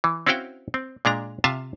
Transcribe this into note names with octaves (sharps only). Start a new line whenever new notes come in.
E3
C4 C#4 E4 F#4 F5 G5
C4
A#2 G#3 D4 A#5
C3 F4 E5 F5 A5